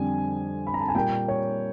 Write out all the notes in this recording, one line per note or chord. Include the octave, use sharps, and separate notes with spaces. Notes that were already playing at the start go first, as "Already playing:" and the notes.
Already playing: F2 D3 G3 G#5
B5
A#5
A5
G#5
A#2 G3 A#3 G5
C#5